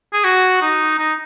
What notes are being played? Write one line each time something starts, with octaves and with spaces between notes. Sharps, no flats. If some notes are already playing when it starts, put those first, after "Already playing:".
G#4
F#4
D#4
D#4